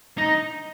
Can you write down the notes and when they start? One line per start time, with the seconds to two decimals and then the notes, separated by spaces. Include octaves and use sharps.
0.18 D#4